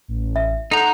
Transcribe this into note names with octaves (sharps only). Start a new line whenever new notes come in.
A1
E5
D#4 A4 F#5 A#5 C6 G6